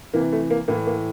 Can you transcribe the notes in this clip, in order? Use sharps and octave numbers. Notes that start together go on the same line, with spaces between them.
C3 E3 A#3
A3
A#3
A2 E3 A#3
A#3